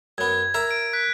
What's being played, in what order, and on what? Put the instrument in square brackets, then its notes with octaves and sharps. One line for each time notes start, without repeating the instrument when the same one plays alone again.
[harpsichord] F#2 B3 [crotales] G#6
[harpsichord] A#4 E5 A#5
[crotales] D7
F#6 B6